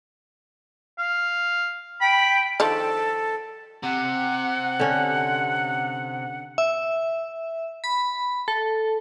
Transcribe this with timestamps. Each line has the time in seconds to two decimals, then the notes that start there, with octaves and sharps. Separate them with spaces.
0.98 F5
2.01 G5 B5
2.60 D#3 F3 D4 A4
3.83 C3 F#5
4.79 D3 C#4
6.58 E5
7.84 B5
8.48 A4